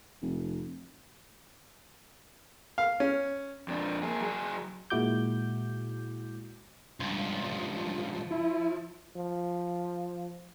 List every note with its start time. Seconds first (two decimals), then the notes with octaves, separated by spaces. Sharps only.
0.22 F1
2.78 F5
3.00 C#4
3.68 F2 D4
4.03 A#3 G#4
4.21 F#3 G#4
4.90 A#2 G#3 E4 F#4 D6 G6
7.00 C#2 G2 F3
8.31 E4
9.17 F3